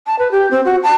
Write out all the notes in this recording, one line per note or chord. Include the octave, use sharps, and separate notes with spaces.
A5
B4
G4
C4
F#4
A5